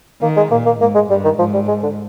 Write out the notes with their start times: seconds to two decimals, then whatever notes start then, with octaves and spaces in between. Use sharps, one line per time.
0.21 D#3 A#3
0.36 G#3
0.51 A#2 A#3
0.65 A#3
0.81 G#2 A#3
0.95 G#3
1.09 G2 G3
1.24 D#3
1.39 G#2 F3
1.53 G3
1.67 G#3
1.83 D3